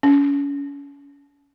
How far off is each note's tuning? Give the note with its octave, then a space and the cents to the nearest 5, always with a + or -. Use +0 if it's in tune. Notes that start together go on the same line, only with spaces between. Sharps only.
C#4 +30